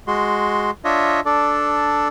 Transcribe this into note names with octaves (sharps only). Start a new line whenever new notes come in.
G#3 F#4 C6
D4 F4 C#5 D#5 E5
D4 A4 D5